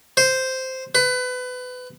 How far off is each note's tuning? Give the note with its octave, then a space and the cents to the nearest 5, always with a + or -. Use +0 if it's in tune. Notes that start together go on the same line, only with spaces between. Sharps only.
C5 -5
B4 +25